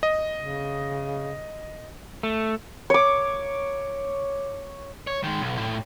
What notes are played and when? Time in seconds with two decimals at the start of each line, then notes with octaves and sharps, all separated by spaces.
0.03 D#5
0.37 C#3
2.23 A3
2.90 C#5 D6
5.07 C#5
5.24 D#3 G#3
5.41 B1
5.59 A2